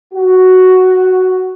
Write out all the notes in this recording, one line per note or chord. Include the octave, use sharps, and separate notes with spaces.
F#4